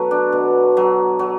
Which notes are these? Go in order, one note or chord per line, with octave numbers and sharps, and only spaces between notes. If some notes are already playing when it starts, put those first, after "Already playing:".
Already playing: B2 F#3 A4 B4
D4
B2
F#3
F#3